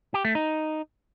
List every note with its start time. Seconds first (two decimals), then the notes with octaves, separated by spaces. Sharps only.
0.14 G4
0.25 A3
0.35 D#4